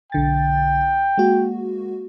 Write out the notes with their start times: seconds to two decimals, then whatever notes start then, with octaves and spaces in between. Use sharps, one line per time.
0.12 B1 D3 G5 A6
1.18 G#3 A#3 F#4